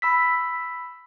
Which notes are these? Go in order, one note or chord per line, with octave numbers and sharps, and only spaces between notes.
B5 E6 B6